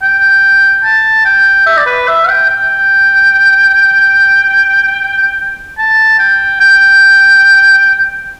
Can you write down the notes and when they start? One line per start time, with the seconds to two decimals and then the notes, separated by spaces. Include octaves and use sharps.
0.02 G5
0.84 A5
1.25 G5
1.66 E5
1.77 D5
1.86 B4
2.08 E5
2.29 G5
2.49 G5
5.78 A5
6.19 G5
6.60 G5